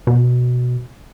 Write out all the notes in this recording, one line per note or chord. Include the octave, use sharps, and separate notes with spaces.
B2